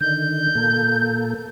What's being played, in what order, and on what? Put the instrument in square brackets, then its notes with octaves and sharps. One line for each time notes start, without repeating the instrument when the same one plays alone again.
[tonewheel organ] D3 D#3 [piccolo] G6
[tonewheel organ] A#2 A#3 A4